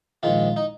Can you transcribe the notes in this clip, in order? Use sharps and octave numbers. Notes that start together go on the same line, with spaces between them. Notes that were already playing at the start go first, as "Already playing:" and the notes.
A#1 G#2 D#3 F4
D#4